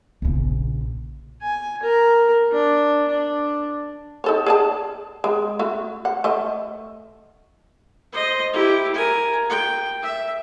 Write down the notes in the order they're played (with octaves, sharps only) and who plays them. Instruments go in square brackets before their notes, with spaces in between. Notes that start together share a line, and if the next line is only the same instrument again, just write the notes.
[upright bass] A#1 C#3
[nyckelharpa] G#5
A#4
D4
D4
[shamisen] D#4 A4 C#5
G#4 D5 A5
G#3
A3 F#4
F#5
A3 D#5
[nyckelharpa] C5 D#5
E4 G4
A#4 G#5
G5
E5